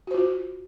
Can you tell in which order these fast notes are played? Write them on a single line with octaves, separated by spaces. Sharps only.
F#4 C5 F4